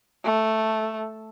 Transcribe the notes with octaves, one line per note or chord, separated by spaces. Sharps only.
A3